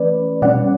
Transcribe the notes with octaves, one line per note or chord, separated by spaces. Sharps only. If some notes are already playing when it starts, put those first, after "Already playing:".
Already playing: E3 A3 C#4 B4 D5
B2 G3 C#4 D5 F#5